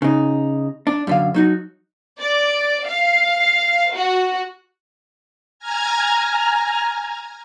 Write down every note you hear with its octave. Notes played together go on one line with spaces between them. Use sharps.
C#3 D#4
D4
F#2 D3 F5
F#3 D#4 F#4
D5
F5
F#4
G#5 A#5 F6 G#6